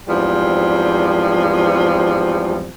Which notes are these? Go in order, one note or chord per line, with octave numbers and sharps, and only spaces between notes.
E2 G#2 F3 G3 C4